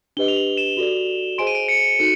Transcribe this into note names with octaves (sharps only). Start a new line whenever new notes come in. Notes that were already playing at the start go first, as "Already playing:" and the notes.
D4 G4 B4 D#5 G7
F7
F#7
E7
F#4 A4 D5
G#4 C5 D#5 G#5 C6 D7
D#7
D7
C#7
D#4 F#4 A4 C#7